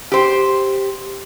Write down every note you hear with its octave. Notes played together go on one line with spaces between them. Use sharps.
G4 C5